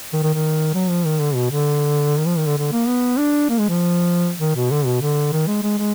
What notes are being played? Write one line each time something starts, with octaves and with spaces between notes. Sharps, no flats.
D#3
D#3
D#3
F#3
F3
D#3
D3
B2
D3
D#3
F3
D#3
D3
D3
A#3
B3
D4
A#3
G#3
F3
D#3
B2
D3
B2
D3
D#3
G#3
G#3
G#3